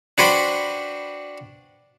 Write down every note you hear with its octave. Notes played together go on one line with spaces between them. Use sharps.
D4 F#4 B4 C5 G5